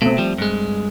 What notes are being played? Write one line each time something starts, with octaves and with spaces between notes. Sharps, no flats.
B2 A3 C4
F3 G3
G2 G#3